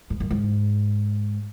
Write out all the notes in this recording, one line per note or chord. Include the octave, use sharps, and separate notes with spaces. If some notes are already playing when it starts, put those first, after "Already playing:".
G#2
F#2
G#2